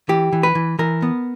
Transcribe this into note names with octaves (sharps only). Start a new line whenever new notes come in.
E3 G4
E3
B4
E3
E3 A#4
B3